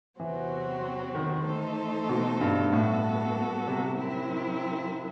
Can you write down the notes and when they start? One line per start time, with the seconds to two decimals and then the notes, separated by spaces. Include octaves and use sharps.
0.20 E2 C3 E3 F#3 C4 F#4
1.15 D#3
1.46 E3 A3 D#4 A4 C5
2.09 B2
2.41 G2
2.72 A2 G3 B3 F#4 A4
3.67 C3
3.98 F#2 F#3 C4 E4